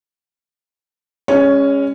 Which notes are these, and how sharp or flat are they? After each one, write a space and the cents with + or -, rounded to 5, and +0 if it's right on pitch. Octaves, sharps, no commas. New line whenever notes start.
G#3 -25 C#4 +0 C#5 +15